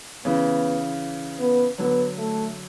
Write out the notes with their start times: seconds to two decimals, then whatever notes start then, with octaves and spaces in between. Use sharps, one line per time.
0.25 C#3 E3 B3
1.40 B3
1.78 D3 F#3 B3
2.18 A3